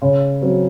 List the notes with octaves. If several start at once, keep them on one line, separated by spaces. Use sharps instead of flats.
C#3
F#3 C4